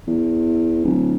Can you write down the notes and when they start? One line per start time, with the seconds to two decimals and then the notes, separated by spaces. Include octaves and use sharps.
0.07 E2
0.85 D1